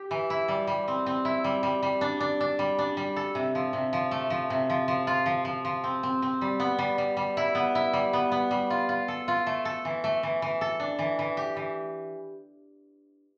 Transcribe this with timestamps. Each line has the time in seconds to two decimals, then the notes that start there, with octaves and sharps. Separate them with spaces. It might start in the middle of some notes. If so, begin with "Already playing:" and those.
Already playing: G4
0.11 E3
0.30 E4
0.48 G3
0.67 G3
0.88 C4
1.06 C4
1.25 E4
1.44 G3
1.63 G3
1.83 G3
2.01 D4
2.20 D4
2.40 D4
2.59 G3
2.79 D4
2.97 G3
3.16 A4
3.35 C3
3.55 F3
3.73 C3
3.93 F3
4.11 A3
4.30 F3
4.50 C3
4.70 F3
4.88 F3
5.07 F4
5.26 F3
5.45 F3
5.65 F3
5.84 C4
6.03 C4
6.22 C4
6.41 G3
6.60 B3
6.78 G3
6.98 G3
7.17 G3
7.37 E4
7.55 B3
7.75 E4
7.93 G3
8.13 B3
8.32 B3
8.51 G3
8.70 F4
8.89 F4
9.08 A4
9.28 F4
9.47 A3
9.65 A4
9.85 E3
10.04 A3
10.23 E3
10.42 E3
10.61 A4
10.80 D4
10.99 E3
11.19 E3
11.37 G4
11.57 E3